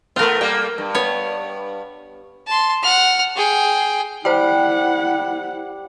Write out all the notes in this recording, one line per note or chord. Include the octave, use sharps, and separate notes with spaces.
A3 B3 F4 A#4
G3 A#3 G5
G2
B3 C#5
A5 C6
F#5 F6
G#4 G5
G3 E4 C5 F#5 G5